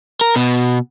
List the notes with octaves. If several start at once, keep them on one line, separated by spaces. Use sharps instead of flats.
A#4
B2